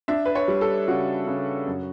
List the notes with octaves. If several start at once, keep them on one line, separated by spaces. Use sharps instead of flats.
D4 E5
B4
C#5
G3
A4
C#3 F#4
C#3
F#2